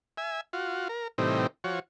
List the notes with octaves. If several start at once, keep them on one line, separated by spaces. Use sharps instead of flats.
E5 G#5
F4 F#4
A#4
A2 C3 E3 G3 C4 D#4
F3 F#4 C#5